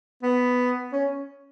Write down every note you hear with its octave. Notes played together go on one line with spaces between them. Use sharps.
B3
C#4